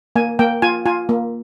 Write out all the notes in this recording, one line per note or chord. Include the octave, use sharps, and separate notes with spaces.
A#3 G#5
A#3 G5
F4 G#5
F4 G#5
A#3